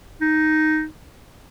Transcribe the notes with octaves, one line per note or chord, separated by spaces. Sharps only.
D#4